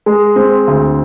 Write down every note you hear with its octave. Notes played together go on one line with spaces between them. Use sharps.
G#3
C4
D2